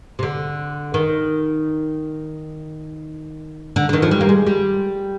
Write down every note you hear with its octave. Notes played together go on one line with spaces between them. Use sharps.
C3
D3
D#3
D3
D3
D#3
F3
G3
A#3
G#3
G3